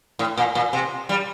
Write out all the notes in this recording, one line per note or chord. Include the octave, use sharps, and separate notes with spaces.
A2
A#2
A#2
C3
G3